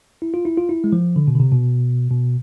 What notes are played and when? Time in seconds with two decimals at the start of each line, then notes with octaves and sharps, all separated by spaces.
0.22 E4
0.34 F4
0.45 E4
0.58 F4
0.69 E4
0.84 G#3
0.92 F3
1.16 D3
1.28 B2
1.35 D3
1.40 C3
1.52 B2
2.11 B2